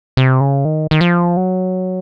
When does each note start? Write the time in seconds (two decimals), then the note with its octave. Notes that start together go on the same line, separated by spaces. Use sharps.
0.17 C3
0.41 C#3
0.65 D#3
0.91 D#3
1.01 F3
1.37 F#3